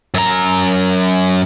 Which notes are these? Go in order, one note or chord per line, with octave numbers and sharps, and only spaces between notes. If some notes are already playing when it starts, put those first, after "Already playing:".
F#2 A#5